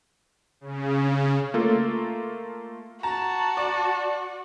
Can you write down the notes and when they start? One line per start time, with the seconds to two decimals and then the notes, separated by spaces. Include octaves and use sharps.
0.61 C#3
1.54 A3 A#3 F4 A4
3.03 F#4 A5 A#5
3.57 D5